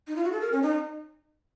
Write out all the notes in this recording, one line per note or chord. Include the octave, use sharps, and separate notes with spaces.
D#4
F4
F#4
A4
A#4
C#4
D#4